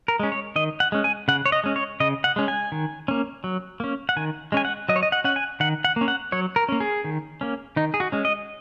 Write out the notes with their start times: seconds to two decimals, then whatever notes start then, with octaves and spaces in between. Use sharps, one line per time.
0.08 A#4
0.20 G#3 C#4
0.32 C#5
0.56 D#3 D#5
0.80 F#5
0.92 G#3 C#4
1.04 G#5
1.28 C#3 F#5
1.46 C#5
1.52 D#5
1.64 G#3 C#4
1.76 C#5
2.00 C#3 D#5
2.24 F#5
2.36 G#3 C#4
2.48 G#5
2.72 D#3
3.08 A#3 C#4
3.44 F#3
3.80 A#3 C#4
4.09 F#5
4.17 D#3 G#5
4.52 G#3 C#4 G#5
4.65 F#5
4.89 F#3 D#5
4.96 C#5
5.03 D#5
5.12 F#5
5.24 C#4 F#5
5.36 G#5
5.60 D#3 F#5
5.84 F#5
5.96 A#3 C#4
6.08 F#5
6.32 F#3 C#5
6.56 A#4
6.69 A#3 C#4
6.80 G#4
7.04 D#3
7.41 A#3 C#4
7.76 D#3 D#4
7.94 G#4
8.00 F#4
8.12 G#3 C#4
8.25 D#5